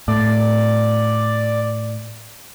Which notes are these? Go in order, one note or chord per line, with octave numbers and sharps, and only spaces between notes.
A2 D5